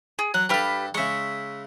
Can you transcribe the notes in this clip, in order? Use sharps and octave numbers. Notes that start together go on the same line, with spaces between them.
G#4
F#3 F#6
G2 G4 A4 B4 F6
C#3 G#3 E5 C#6